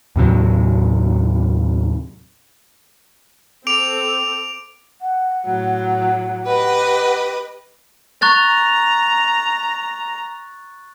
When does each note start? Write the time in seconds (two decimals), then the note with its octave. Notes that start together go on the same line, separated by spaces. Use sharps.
0.16 D#2 A2 C3 F#3
3.67 C4 A4 D6 D7 F7
5.01 F#5
5.46 A2 F#3
6.45 G4 B4 D#5
8.22 A#5 C#6 F#6 A6